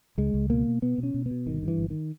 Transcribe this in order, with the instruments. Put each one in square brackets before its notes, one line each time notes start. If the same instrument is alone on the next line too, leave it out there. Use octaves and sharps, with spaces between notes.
[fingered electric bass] C#2 G#3
C#2
B2 A#3
B2
B2 B3
B2
C#4
B2
B3
B2
G1 D#3
G2
E3
G1
D#3